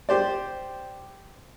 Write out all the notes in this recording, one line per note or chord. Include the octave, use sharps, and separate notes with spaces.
G4 C5 D5